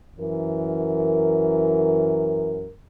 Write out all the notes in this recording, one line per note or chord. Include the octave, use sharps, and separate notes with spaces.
F#2 E3 A#4